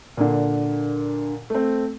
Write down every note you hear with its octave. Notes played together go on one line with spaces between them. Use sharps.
A#2 D3
A3 C4